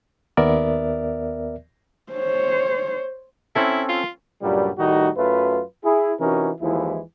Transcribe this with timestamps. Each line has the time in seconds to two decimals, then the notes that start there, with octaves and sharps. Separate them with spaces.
0.37 D#2 B3 A#4 D5 E5
2.12 C5 C#5
3.56 C4 C#4 E4 A4
3.89 F4
4.42 C#2 G2 A#2 F#3 G3
4.78 A2 D#3 G3 A3 D#4 F#4
5.17 F#2 F#3 A3 F4 B4
5.84 E4 G#4
6.20 C3 E3 C#4 D#4 F#4 A#4
6.61 D#2 E3 F3 G#3 E4